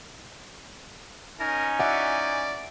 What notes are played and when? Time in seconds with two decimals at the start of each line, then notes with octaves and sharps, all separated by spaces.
1.40 C#4 D#4 A#4 G#5
1.80 D5 E5 F#5